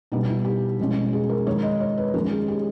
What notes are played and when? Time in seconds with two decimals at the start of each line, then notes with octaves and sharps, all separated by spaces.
0.12 B2 G3 B3 D#4
0.28 E4
0.45 G4
0.80 B2 G#3 C#4
1.13 G#4
1.29 A#4
1.47 D#3 G#3 D#4 C#5
1.63 D#5
1.80 C#5
1.98 B4
2.14 D#3 G#3 C#4 A#4
2.31 G#4
2.48 G4